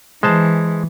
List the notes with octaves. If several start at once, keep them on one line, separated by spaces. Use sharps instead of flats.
E3 G#3 C5 A5